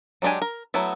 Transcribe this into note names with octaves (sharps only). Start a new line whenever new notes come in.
F#3 G#3 D4 G4 G#5
A#4
F#3 A3 B3 E4